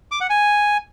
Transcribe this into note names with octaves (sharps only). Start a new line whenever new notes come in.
D6
F#5
G#5